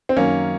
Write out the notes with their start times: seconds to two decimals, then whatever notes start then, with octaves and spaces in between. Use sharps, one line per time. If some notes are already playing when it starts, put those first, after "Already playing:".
0.09 C4
0.17 F#2 D#3 A#3 C#4